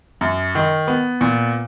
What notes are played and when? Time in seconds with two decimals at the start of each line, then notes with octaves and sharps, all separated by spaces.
0.21 F#2
0.55 D#3
0.88 B3
1.21 A#2